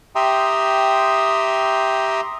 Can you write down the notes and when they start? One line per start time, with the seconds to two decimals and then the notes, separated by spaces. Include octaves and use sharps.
0.15 G4 E5 G5 A#5 C6 D#6